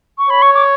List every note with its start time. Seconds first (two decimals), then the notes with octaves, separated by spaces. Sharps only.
0.18 C#6
0.29 C#5 B5
0.42 C#6
0.55 D6